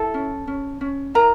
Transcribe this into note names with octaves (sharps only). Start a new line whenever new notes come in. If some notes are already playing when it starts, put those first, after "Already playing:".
Already playing: E4 A4
C#4
C#4
C#4
E4 A#4 A#5